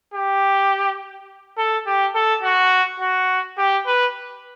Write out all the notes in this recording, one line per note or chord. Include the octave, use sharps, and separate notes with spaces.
G4
A4
G4
A4
F#4
F#4
G4
B4